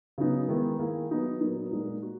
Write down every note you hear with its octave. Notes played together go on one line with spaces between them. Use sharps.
C#3 F#3 B3 D#4
D#3 G#3 B3 E4 G#4
D#3 A#3 E4 G#4
F#3 B3 D#4 F#4
A#2 F#3 B3 D#4 A#4
A#2 G#3 D#4 A#4
F#4